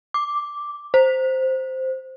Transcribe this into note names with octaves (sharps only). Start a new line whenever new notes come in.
D6
C5